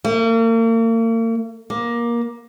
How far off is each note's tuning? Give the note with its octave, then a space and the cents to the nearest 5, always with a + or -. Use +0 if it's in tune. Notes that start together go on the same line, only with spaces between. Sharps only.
A#3 -40
A#3 +20